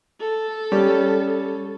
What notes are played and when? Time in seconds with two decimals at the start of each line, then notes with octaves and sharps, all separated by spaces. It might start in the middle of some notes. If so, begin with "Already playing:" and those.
0.20 A4
0.72 G3 C#4